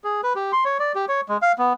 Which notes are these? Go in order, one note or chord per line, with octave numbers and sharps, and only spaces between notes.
G#4
B4
G4
C6
C#5
D5
G4
C#5
G#3
F5
B3